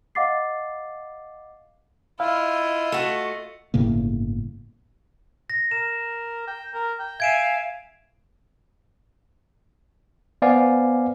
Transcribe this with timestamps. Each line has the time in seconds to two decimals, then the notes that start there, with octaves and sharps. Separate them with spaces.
0.15 D#5 F5 F#5 D6 A6 C7
2.20 E4 F4 D#5 F5
2.92 A3 F#4
3.74 G1 A2 C#3 A#3
5.50 A#6
5.71 A#4 E7
6.47 G5
6.74 A#4
7.00 G5
7.20 E5 F5 G#5 G#6 D7 E7
10.42 B3 C5 D5 F5 G#5